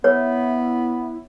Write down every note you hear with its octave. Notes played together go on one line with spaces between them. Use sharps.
B3 E4 C#5